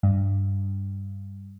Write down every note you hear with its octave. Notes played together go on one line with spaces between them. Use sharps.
G2